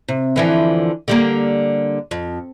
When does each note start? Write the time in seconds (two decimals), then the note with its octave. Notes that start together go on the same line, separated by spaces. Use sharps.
0.08 C3
0.36 D3 E3 F3
1.08 D3 G3 A#3
2.11 F2